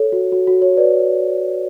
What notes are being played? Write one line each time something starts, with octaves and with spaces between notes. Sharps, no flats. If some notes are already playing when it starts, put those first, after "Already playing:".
Already playing: A4 C#5
F#4
F#4
F#4
C#5
B4 D5